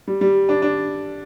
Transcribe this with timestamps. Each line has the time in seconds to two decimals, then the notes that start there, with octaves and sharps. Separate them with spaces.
0.08 G3
0.21 G3
0.49 D4
0.62 D4